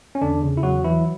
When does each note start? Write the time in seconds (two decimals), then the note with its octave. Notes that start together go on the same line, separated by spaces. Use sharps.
0.15 C#4
0.21 E2 D3 D4
0.43 C#3
0.57 E4
0.63 E2 F#3 F#4
0.84 E3 F#3 E4